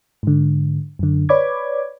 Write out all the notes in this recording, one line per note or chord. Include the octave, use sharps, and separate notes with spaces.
G#2 D3
F#2 D3
B4 C#5 D5 B5 D6 G#6